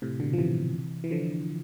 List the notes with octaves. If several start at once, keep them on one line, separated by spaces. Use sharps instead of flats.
A2 C3
B2 D3
F3
C3 E3
E3
D3 F3